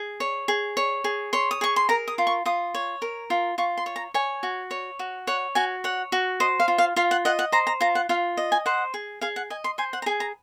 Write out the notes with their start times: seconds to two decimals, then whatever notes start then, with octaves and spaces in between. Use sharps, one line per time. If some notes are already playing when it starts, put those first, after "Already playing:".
Already playing: G#4
0.20 C#5
0.48 G#4
0.77 C#5
1.04 G#4
1.33 C#5 C6
1.51 D#6
1.61 G#4 C#6
1.76 C6
1.89 A#4 A#5
2.08 D#6
2.18 F4
2.27 C#6
2.46 F4 D#6
2.74 C#5
3.02 A#4
3.30 F4
3.58 F4 C#6
3.77 C6
3.86 C#5
3.96 A#5
4.14 C#5 G#5
4.43 F#4
4.71 C#5
4.99 F#4
5.27 C#5 F#5
5.55 F#4 G#5
5.84 C#5 F#5
6.12 F#4
6.40 C5 D#5
6.60 F5
6.68 F4
6.78 F5
6.96 F4 F5
7.11 F#5
7.25 D#5 F#5
7.39 F#5
7.52 C5 A#5
7.67 A#5
7.81 F4 A#5
7.95 F#5
8.09 F4 F5
8.37 D#5
8.52 G#5
8.66 C5 F#5
8.94 G#4
9.21 G#4 F5
9.36 F#5
9.50 D#5 G#5
9.64 C6
9.78 C5 G#5
9.93 F#5
10.02 A#5
10.06 G#4 G#5
10.20 A#5